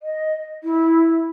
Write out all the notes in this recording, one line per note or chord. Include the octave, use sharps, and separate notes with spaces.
D#5
E4